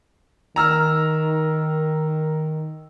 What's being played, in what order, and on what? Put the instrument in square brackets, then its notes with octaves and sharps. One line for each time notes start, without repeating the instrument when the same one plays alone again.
[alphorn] D#3 [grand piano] A#5 E6 F6